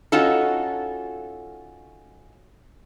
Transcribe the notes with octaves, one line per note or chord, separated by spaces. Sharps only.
C#4 D#4 F4 F#4 A4